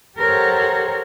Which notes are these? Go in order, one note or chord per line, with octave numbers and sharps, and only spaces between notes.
G4 A4 A#4 C5 C#5 F#5